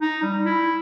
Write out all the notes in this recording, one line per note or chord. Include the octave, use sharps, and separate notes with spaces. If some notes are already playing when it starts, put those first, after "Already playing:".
D#4
G3
E4